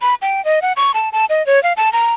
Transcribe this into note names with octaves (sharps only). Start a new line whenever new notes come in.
B5
G5
D#5
F#5
C#6
A5
A5
D#5
C#5
F5
A5
A#5